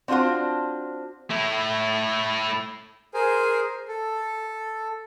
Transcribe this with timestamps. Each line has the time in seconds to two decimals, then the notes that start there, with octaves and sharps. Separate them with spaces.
0.08 C4 D4 F4 F#4 C5
1.30 A3 E4
3.14 G#4 A#4 C5 G#5
3.88 A4